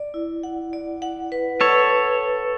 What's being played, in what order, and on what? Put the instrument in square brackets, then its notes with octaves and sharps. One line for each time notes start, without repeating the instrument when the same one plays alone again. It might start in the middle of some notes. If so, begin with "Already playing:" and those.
Already playing: [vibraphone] D5
E4
F#5
D5
F#5
B4
[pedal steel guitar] A4 C#5 [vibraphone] B4